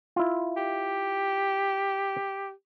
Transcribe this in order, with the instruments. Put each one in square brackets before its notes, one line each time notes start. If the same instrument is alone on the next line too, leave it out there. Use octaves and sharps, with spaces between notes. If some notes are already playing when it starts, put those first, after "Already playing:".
[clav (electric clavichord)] E4 F4
[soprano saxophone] G4